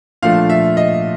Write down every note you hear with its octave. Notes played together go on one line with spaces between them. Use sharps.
A#2 F3 A3 D4 F5
E5
D#5